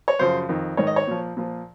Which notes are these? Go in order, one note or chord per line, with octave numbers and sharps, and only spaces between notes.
C#5
F#2 C#3 F3 C5
F2 D#3
G#2 D#3 C#5
D#5
C#5
A#2 F3
A#2 F3